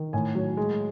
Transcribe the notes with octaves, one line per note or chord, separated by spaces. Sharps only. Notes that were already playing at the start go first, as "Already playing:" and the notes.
Already playing: D#3
A2 G#5
F#3
G#3